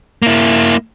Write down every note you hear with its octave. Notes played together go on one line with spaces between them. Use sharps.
A#3 E4